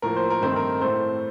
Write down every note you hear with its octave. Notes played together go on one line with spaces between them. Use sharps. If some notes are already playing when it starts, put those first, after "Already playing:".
A2 F3 A#3 A#4
C5
A#4
G2 D#3 A3 C4 C5
A#4
A2 A3 C4 C5